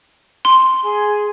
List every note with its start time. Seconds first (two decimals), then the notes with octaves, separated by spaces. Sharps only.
0.45 C6
0.83 G#4 G#5